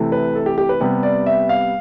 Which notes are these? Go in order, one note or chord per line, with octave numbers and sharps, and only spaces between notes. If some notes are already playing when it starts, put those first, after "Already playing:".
Already playing: C3 E3 A3
B4
A4
G4
G4
B4
C3 G3 B3
D5
E5
F5